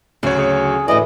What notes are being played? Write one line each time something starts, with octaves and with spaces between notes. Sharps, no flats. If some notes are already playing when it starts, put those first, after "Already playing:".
D2 C#3 F#3 C#5
G#4
A2 E3 D5 D#5